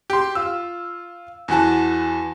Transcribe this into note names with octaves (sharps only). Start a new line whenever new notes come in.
G4 C6
F4 E6
E2 E3 F#4 A5